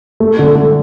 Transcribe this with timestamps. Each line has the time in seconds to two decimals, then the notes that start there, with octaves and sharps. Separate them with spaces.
0.20 A3
0.39 D3
0.55 D3